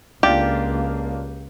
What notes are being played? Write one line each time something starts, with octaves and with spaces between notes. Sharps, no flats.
C#2 A#3 D4 F4 G4